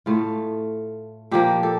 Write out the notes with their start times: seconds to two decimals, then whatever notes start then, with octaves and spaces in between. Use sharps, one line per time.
0.06 A2 A3 F4
1.31 A#2 F3 A#3 G4
1.63 A4